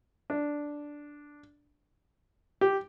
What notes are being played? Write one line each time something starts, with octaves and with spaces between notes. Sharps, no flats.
D4
G4